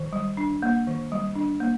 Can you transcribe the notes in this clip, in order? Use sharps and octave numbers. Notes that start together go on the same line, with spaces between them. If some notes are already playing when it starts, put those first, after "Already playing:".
Already playing: D#3
G3
D4
A#3
D#3
G3
D4
A#3